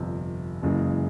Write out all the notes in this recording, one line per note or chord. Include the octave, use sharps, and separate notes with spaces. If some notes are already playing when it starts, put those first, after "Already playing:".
Already playing: G1 F2 C3
F#1 F#2 C#3 E3 G#3